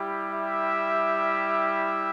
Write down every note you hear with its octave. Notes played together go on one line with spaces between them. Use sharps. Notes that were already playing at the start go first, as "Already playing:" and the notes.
Already playing: G3 E4 G4
E5